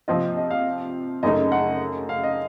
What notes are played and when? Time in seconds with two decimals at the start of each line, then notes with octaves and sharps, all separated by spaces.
0.08 C3 F3 C4 F4 D#5
0.37 D#5
0.51 F5
1.23 F#2 C#3 A3 D#4 D#5
1.52 F#5
2.09 F5
2.23 D#5